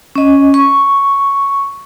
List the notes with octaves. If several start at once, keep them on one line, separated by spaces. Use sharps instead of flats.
C#4 D#5
C#6